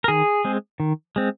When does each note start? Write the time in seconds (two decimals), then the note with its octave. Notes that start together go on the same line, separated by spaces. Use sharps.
0.04 A#4
0.08 D#3 G#4
0.45 G#3 C4
0.80 D#3
1.16 G#3 C4